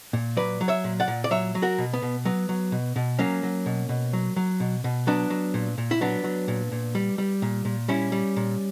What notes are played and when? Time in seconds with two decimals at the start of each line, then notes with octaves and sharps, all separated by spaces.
0.13 A#2
0.37 F#3 B4 D5
0.61 F#3
0.68 C#5 E5
0.84 A#2
1.00 D5 F#5
1.08 A#2
1.24 D5
1.31 F#3 C#5 E5
1.55 F#3
1.62 F#4 A#4
1.78 B2
1.93 B3
2.02 B2
2.25 F#3 B3
2.49 F#3
2.72 B2
2.96 B2
3.19 F#3 A#3 C#4
3.43 F#3
3.66 B2
3.89 B2
4.13 F#3
4.36 F#3
4.60 B2
4.84 B2
5.07 F#3 B3 D4
5.30 F#3
5.54 A#2
5.78 A#2
5.91 E4
6.01 F#3 B3 D4
6.24 F#3
6.48 A#2
6.72 A#2
6.95 G3
7.18 G3
7.42 A#2
7.65 A#2
7.88 G3 C#4 E4
8.12 G3
8.36 A#2